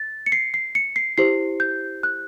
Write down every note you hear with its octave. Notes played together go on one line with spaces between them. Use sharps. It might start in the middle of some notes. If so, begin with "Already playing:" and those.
Already playing: A6
C#7
C7
C7
C#7
C7
E4 G4 C5 C7
G6
F#6